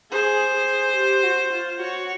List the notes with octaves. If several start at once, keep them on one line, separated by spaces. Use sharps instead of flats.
G#4 C5
G#4
G4
F#4
F4
F#4 C#5